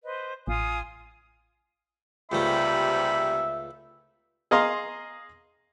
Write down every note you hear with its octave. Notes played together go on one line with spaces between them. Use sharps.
B4 C5 D#5
A1 F4 G#5 D#6
C#2 G#2 C3 G3 A3 E5 B5
G#4 D#5 F5 A#5 C6